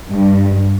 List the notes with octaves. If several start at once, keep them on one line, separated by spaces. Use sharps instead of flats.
G2